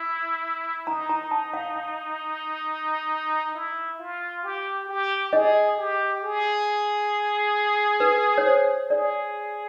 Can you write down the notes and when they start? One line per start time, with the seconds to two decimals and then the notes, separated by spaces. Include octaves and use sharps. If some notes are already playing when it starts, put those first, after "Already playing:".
Already playing: E4
0.87 D#4 A#5
1.09 A#5
1.31 A5
1.53 F5
1.76 F5
3.55 E4
3.99 F4
4.44 G4
4.89 G4
5.33 G#4 D#5
5.77 G4
6.22 G#4
8.00 B4
8.38 C#5
8.46 C5
8.90 G#4 D5